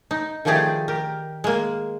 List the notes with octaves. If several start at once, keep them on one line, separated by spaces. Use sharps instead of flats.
D#4
D#3 F3 A3 G4 G#4 D5
G4 A#4
G#3 A#3